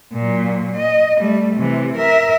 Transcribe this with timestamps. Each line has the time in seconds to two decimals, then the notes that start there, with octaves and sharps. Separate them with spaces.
0.13 A#2 F#3
0.76 D#5
1.18 G3 A3
1.56 C3 E3
1.97 A#4 E5